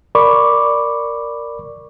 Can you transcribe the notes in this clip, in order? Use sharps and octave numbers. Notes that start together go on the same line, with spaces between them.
A#4 D5 B5 C#6 D6